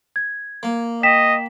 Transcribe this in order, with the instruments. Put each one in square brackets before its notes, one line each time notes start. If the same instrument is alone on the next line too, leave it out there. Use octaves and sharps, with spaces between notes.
[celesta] G#6
[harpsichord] A#3
[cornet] D#5 [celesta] G5 B6 E7